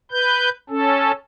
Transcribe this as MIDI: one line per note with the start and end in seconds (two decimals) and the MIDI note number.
0.11 0.49 71
0.11 0.49 91
0.70 1.12 61
0.70 1.12 69